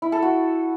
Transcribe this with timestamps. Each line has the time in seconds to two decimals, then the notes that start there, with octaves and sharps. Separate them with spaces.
0.02 E4
0.12 A4
0.22 F#4